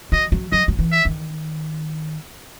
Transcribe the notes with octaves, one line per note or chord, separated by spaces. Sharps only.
F#3 D#5
F#3
F#3 D#5
F#3
E3
E5
D#3